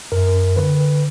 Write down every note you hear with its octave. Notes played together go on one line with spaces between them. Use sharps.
F#2 A#4
D3 B4